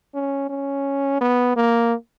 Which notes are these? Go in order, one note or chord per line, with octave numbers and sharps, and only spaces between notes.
C#4
C#4
B3
A#3